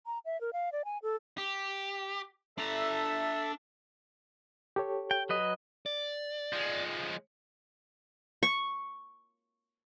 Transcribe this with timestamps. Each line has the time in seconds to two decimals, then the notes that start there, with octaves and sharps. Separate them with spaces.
0.06 A#5
0.25 E5
0.41 A#4
0.53 F5
0.72 D5
0.85 G#5
1.03 A4
1.38 G4
2.58 D4 A4 E5 A5 A#5
4.76 G4 A4 C#5
5.11 G5
5.29 F#3 B4 D#5
5.86 D5
6.53 F3 G#3
8.43 C#6